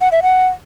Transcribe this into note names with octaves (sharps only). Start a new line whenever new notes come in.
F#5
E5
F#5